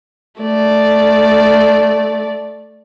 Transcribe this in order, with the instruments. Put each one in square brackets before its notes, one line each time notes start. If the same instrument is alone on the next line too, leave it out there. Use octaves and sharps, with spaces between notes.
[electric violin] A3 D5